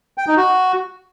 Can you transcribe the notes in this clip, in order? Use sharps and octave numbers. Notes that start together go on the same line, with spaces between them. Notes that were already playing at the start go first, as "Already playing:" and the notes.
G5
D#4
F#4